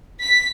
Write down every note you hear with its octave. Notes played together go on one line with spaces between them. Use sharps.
B6